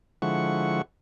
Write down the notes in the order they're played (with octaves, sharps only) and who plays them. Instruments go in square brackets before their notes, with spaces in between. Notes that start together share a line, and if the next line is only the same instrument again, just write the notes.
[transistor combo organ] D3 F3 G#3 E4 F#5 C#6